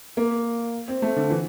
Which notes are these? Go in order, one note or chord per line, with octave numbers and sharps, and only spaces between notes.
A#3
C4
A3
D3
E3